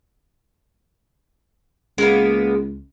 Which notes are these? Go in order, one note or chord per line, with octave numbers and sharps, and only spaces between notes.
C#2 G#3 A#3 B3